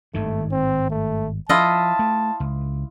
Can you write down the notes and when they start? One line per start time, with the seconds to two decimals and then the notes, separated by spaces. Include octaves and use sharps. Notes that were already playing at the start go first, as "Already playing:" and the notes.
0.14 G#1 G2 D#3 A3
0.52 C4
0.91 A3
1.49 F3 E4 F4 D#5 A5
1.99 A3
2.40 C#2